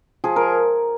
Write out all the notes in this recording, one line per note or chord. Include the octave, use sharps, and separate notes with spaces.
F3 G#4
A#4